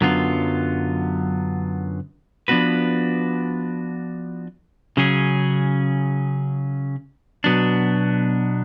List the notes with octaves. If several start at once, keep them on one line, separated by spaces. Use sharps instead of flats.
F#2 D3 F#3 B3 F4
F3 B3 D4 F#4 B4
C#3 F#3 C#4 G#4
B2 F#3 B3 D4